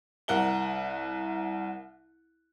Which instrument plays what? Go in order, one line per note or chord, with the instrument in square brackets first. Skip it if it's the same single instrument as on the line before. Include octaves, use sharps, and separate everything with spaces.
[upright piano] C2 A#4 F#5 G7